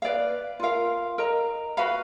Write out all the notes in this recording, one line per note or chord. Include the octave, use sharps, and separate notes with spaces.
B4 D5 F5
F4 A#4 F5
A#4 D#5 A#5
F#4 B4 F5 B5